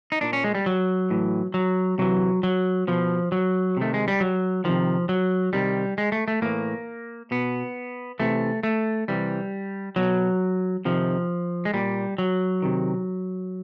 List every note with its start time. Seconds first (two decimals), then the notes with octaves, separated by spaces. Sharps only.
0.12 D#4
0.21 A#2 D4
0.33 C#4
0.44 G#3
0.55 G3
0.66 F#3
1.10 A2 E3
1.54 F#3
1.98 C3 E3 F#3
2.43 F#3
2.88 B2 F3
3.32 F#3
3.77 C3 D#3 A3
3.94 G#3
4.08 G3
4.20 F#3
4.64 C3 D#3 F3
5.09 F#3
5.53 C3 D#3 G3
5.98 G#3
6.12 A3
6.28 A3
6.42 A2 E3 A#3
7.31 B2 B3
8.19 C3 E3 A3
8.63 A3
9.08 C3 E3 G3
9.96 B2 F#3
10.85 C3 D#3 F3
11.65 G#3
11.74 A#2 G3
12.18 F#3
12.62 C3 D#3